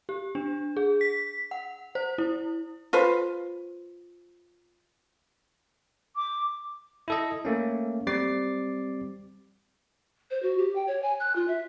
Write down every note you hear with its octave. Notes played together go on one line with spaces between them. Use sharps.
G4
D4
G#4
B6
F#5
C5
E4
F4 B4 C5
D6
E4 A4 D#5
A3 A#3 C#4
G3 C4 D6 A6 C7
C5
F#4
G4
G5
C#5
G#5
F#6
F4
E5